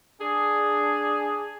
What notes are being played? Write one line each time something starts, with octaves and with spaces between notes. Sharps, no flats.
D4 G#4